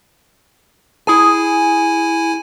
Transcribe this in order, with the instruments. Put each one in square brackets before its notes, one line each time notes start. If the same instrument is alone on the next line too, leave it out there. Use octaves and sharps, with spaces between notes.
[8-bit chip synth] E4 G#5 [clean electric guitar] G#4